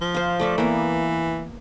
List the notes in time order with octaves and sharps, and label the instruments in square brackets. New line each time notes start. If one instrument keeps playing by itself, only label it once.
[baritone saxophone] F3
[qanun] C5 F5
A3 D5 E5
[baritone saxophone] E3 [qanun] A#3 B3